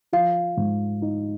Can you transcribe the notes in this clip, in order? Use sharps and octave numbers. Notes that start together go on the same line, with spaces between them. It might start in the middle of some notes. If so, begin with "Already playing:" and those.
F3 F5
G#2
D#4